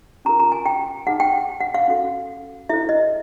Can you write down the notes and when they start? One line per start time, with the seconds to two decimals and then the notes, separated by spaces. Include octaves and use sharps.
0.25 C#4 F4 A#4 A#5
0.40 A#5
0.52 G#5
0.66 G5
1.07 D#4 G#4 B4 F#5
1.20 G5
1.61 F#5
1.74 F5
1.88 C#4 F#4 A4
2.69 E4 A4 C5 E5
2.89 D#5